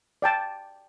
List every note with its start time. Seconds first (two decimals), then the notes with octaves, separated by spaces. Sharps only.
0.22 D5 G5 A5